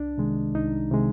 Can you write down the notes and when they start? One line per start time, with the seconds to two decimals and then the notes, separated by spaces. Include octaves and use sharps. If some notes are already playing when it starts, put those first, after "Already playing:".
Already playing: C2 D4
0.18 C3 D#3 G#3
0.54 C2 D#4
0.91 C3 D#3 G#3